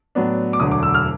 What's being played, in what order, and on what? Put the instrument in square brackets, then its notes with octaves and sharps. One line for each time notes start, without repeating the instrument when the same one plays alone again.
[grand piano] A2 F#3 B3 D4
D6
E1 D2 D3 F#3 D#6
D6
E6
F6